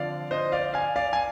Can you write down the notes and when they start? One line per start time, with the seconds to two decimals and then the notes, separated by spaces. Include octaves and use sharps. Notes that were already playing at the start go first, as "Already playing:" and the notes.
Already playing: D3 F3 C4 D5 F5
0.31 C5 D#5
0.52 D5 F5
0.74 F5 G#5
0.96 D5 F5
1.13 G#5